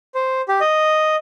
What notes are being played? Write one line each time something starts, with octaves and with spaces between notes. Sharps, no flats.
C5
G4
D#5